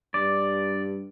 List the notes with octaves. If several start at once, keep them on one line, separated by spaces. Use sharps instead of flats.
G2 D5